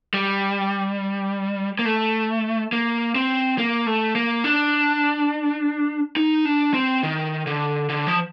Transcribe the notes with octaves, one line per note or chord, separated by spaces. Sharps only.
G3
A#3
A3
A#3
C4
A#3
A3
A#3
D4
D#4
D4
C4
D#3
D3
D3
F3